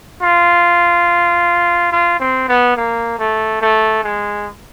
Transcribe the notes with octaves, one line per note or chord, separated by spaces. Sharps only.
F4
F4
C4
B3
A#3
A3
A3
G#3